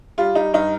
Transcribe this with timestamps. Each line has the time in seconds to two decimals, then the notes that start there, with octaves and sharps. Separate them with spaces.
0.18 G3 F4
0.35 G3 D#4
0.53 G2 D#4